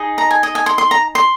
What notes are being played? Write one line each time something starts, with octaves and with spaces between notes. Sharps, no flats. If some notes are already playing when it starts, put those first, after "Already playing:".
Already playing: D#4 G#4 D#5
A#5
G#5
D#5
G#5
C6
C6
A#5
C6